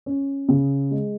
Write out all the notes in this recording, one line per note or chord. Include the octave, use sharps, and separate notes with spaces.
C#4
C#3
G#3